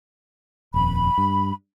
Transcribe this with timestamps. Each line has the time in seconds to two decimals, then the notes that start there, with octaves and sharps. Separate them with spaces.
0.74 D#1 F2 B5
1.18 G2